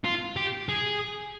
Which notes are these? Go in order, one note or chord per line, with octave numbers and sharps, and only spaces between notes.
F4
G4
G#4